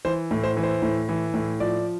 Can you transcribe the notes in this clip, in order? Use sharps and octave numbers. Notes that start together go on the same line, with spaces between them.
E3 C5
A2
C5
E3
C5
A2
E3
A2
F3 D5